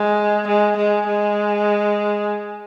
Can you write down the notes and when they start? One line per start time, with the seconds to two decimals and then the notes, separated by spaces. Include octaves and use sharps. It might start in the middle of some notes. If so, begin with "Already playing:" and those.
Already playing: G#3
0.48 G#3
0.77 G#3
1.07 G#3